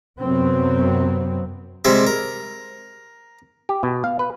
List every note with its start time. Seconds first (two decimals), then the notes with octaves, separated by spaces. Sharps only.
0.20 F#2 C3 F#3 B3 C4
1.85 C3 G3 G#3 E5
2.07 A#4
3.69 G4
3.83 B2
4.04 F5
4.19 B4